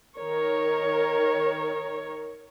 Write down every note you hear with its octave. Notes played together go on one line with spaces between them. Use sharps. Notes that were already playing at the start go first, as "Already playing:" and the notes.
D#3 A#4 C#5